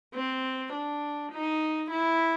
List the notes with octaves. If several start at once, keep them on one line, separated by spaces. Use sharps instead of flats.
C4
D4
D#4
E4